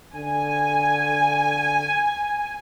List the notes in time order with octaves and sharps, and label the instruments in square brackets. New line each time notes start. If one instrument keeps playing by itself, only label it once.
[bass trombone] D3 [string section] G#5